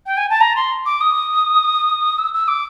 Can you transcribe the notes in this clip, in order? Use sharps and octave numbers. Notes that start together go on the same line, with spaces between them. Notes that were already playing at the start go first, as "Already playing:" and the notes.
G5
G#5
A5
A#5
C6
D6
D#6
E6
E6
D6